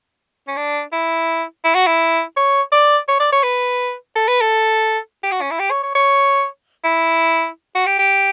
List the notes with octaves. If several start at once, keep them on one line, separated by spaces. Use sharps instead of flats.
C#4
D4
E4
E4
F#4
E4
C#5
D5
C#5
D5
C#5
B4
A4
B4
A4
G4
F#4
C#4
E4
G4
C#5
C#5
C#5
E4
F#4
G4
G4